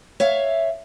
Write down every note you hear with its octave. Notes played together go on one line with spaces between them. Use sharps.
C#5 E5 F5